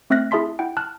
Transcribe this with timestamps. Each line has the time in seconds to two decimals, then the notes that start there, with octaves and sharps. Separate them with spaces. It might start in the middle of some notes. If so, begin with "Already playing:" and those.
0.10 A3 C4 E5 F6 F#6 A#6
0.31 E4 G#4 E5 A5 C6 B6
0.59 E4 F#5 G5
0.77 A5 F6 F#6